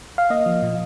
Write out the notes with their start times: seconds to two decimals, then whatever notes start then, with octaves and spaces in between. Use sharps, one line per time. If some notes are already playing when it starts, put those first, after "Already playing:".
0.18 F5
0.30 A#3 D#5
0.46 F3
0.62 A#2